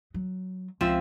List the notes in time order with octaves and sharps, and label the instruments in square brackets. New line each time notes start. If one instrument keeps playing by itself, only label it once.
[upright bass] F#3
[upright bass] C#2 [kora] F3 C4 E5